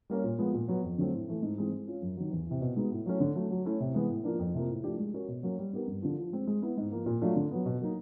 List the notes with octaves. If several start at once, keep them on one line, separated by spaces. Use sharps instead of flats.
G3 A#3 C#4
A#2
F3 G#3 B3
A#2
F#3 B3
F2
D3 F#3 A3 C4
A2
E3 A3
G#2
E3 G#3 C4 D#4
G#3
C#4 F4
F#2
D#3 F#3
E2
C3 E3
B2
G#3 B3 D#4 F#4
A2
F#3 A3 C#4 E4
D3
F#3 A3
F#3
A3 C#4 E4
C3
E3 G#3 B3
A2
F3 A#3 D4
F2
C3 F3 A#3
A2
F3 A3 D4 G4
G#3
C#4 F#4 A#4 C#5
B2
F#3 A#3 C#4
G3
B3 D#4 G4 A#4
G2
D3 F3
F3
G#3 C4
G#3
B3 E4
G#2
F3 A#3
A#2
F#3 A3 D4 F4
D3
F#3 B3
B2
F#3 A#3 D#4